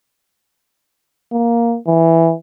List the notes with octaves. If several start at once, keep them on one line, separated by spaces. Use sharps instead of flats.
A#3
E3